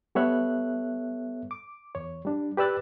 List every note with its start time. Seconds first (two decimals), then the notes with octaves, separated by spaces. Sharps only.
0.15 G3 B3 A4 C#5 E5 F#6
1.51 D6
1.95 E2 C#5
2.25 G3 D4
2.57 G4 B4 D5 E6 F#6 A6